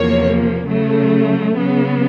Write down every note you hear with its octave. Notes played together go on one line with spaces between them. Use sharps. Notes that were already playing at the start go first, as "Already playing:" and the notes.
Already playing: E2 C3 F3 A#3 C#5
C#3 F#3 A3
C#3 F#3 B3